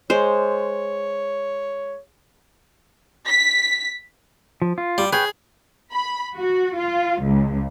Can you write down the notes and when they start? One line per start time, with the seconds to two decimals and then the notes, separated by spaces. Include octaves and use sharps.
0.10 G#3 C5 C#5
3.28 B6
4.62 F3
4.78 F4
4.98 G3
5.13 G#4 B4 C#5 G5
5.92 B5
6.36 F#4
6.77 F4
7.22 C#2